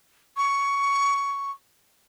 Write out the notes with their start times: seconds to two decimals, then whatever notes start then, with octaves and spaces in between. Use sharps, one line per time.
0.37 C#6